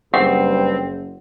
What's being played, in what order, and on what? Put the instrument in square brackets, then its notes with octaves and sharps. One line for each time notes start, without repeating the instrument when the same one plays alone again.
[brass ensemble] F#1 [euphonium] G2 [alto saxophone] C4 [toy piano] F#5